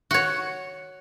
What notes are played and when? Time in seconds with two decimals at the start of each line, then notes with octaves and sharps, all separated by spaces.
0.11 F#4 C#5